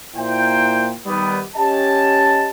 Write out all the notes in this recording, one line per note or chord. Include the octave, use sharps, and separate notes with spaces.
A#2 A#3 E4 C5 G5
D#3 G3 B3
C#4 G4 D#5 A5